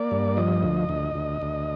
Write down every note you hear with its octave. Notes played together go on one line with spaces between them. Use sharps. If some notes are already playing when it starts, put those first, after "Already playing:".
Already playing: A#3 D5
G2
F3 D#5
D2
D2
D2
D2